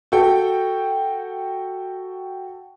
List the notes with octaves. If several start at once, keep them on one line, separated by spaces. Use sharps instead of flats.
F#4 A4 G5